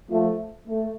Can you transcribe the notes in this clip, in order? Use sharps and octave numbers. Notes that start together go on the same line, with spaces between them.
F3 A3
A3